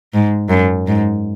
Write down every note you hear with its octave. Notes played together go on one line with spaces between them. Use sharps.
G#2
F#2
G#2